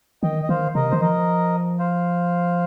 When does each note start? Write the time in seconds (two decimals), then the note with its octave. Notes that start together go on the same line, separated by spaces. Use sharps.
0.23 D#3 D#5 G5
0.43 D#5
0.49 D#3 C5 F5
0.75 C3 A#4 D#5
0.91 D#3 C5
1.01 F3 A#4 D#5
1.79 C5 F5